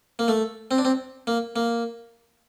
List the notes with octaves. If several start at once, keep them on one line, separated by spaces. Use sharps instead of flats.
A#3
A3
C4
D4
C4
A#3
A#3